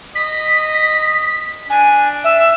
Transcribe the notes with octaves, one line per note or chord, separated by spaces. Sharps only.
D#5 B6
D4 G#5
E5